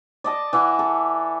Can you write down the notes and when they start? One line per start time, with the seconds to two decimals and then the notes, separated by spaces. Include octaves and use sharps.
0.24 D5 D#5 A5
0.53 E3 E5 F#5
0.79 A4